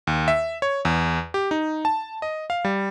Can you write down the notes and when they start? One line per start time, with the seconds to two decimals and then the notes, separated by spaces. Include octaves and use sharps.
0.07 D#2
0.28 E5
0.62 C#5
0.85 E2
1.34 G4
1.51 D#4
1.85 A5
2.22 D#5
2.50 F5
2.65 G3